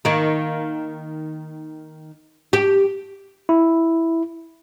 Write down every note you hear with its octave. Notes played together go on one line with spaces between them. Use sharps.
D#3 A#3
G4
E4